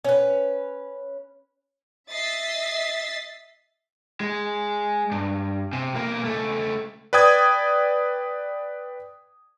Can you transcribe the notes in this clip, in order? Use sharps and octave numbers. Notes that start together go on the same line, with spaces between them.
C#4 B4
D#5 E5 A6 B6 C7
G#3
G2
C3
B1 A#3
C#2 A3
B4 D5 G5 D#6 G#6